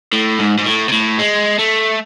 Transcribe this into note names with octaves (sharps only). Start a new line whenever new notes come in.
A2
G#2
G#2
A2
C3
A2
G#3
A3